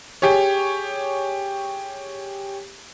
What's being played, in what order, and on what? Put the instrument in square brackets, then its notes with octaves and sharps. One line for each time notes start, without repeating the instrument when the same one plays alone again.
[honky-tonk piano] G4 G#4 C#5